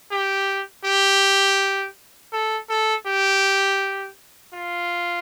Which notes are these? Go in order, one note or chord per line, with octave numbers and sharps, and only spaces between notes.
G4
G4
A4
A4
G4
F4